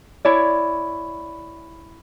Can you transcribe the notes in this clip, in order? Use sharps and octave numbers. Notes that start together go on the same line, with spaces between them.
E4 C#5 D5